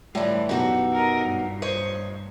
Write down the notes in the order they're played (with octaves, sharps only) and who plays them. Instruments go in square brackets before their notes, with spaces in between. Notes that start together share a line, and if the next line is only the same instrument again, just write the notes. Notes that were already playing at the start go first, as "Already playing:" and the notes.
[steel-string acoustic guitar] A2 D3 [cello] E3 [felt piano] G3 C#5
[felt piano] F#2 B2 G4 [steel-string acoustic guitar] D#4 F#4 A4
[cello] A#4 D#5
G2 A#2
[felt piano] C5 [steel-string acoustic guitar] C#5 D#5